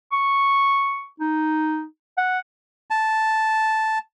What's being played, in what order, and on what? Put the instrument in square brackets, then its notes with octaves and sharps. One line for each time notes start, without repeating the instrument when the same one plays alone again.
[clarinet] C#6
D#4
F#5
[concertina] A5